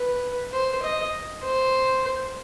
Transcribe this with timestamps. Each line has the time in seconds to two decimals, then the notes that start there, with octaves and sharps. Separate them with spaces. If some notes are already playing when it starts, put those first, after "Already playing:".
Already playing: B4
0.53 C5
0.82 D#5
1.43 C5